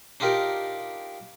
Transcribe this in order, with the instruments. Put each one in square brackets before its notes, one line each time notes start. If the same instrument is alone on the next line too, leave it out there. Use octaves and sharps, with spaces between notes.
[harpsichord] D4 D#4 F4 G4 A#4 D5